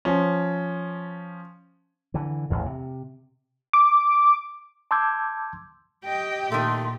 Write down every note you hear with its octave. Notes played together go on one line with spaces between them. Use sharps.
F3 C#4
D3 E3
A1 E2 A2
C3
D6
A5 C6 D6 E6 G6 G#6
G4 D#5 G5
A#2 D#3 A3 C6